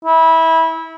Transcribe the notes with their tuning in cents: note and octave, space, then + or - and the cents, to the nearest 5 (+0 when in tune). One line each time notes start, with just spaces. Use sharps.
E4 -20